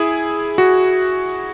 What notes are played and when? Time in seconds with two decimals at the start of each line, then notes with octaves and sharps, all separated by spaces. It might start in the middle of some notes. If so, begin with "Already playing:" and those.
Already playing: E4 G#4
0.58 F#4